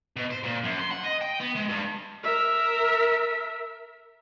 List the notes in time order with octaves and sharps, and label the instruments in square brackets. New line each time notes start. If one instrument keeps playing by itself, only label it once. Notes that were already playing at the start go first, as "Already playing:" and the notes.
[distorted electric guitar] B2
C5
A#2
F#2
C6
F#5
D#5
G5
B3
G#3
G2
[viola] A#4 E5